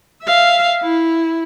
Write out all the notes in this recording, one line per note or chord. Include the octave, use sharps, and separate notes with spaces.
E5 F5
E4